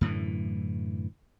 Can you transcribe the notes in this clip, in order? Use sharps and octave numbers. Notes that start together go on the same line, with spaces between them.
F#2 A2 D3 E3